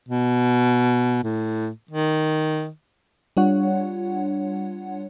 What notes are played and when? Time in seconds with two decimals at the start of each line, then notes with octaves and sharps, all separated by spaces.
0.09 B2
1.24 A2
1.91 D#3
3.37 G3 D4 F4 C#5 F#5